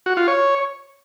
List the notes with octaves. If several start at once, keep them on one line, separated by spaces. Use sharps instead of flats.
F#4
F4
C#5